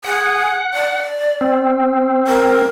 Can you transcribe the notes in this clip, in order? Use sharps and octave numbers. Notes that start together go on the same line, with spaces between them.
G#4 F#5
D5
C4
A#4